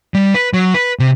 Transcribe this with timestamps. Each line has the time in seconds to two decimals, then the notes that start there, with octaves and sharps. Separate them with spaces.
0.14 G3
0.34 B4
0.53 F#3
0.74 B4
0.99 C3